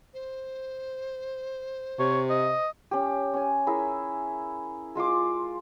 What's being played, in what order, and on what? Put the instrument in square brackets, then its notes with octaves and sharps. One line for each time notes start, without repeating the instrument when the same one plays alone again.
[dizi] C5
[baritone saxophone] C3 [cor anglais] C#5
[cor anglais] D#5
[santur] C#4 G4
C#4 G#5
E4 G#4 A#4 E5
G#3 F4 C6 D6